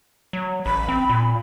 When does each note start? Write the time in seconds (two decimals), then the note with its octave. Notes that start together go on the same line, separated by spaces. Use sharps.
0.33 F#3
0.66 A1 B5
0.88 C4
1.10 A#2